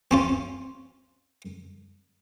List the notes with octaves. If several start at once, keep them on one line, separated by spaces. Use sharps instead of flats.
C4 C#4 F4